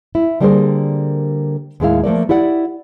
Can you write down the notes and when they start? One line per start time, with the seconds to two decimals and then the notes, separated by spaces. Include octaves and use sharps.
0.15 E4
0.40 D3 G3 A#3 G#4 A#4 C5
1.80 D#2 A2 G#3 D4 E4 F5
2.04 F3 A3 A#3 D5
2.29 E4 G4 D5 F#5